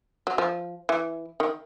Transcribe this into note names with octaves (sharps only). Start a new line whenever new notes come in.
F#3
F3
E3
D#3